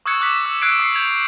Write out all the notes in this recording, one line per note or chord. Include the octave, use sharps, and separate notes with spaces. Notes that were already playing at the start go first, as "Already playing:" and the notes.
C#6 D#6 E6 F#6 G#6 C#7
D6 F#6 G#6 B6
E6
D6 E6 F#6 G#6 C7 D7
D#6 C7 C#7
G6 G#6 F7